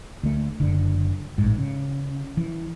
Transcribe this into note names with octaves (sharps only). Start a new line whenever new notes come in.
D2 A3
F#1 D3
A1 G#2
C#3
E3